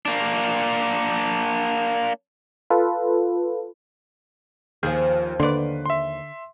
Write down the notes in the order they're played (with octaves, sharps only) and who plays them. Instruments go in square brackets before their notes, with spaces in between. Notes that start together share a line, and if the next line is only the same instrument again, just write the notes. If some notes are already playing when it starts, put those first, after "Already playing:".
[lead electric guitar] A#3 D4
[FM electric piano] F4 A4 B4
[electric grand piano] D#2 F6 G6 [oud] F3 G#4
[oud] D#2 D5 [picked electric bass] D3 [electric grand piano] B4 C6
[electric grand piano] E5 C6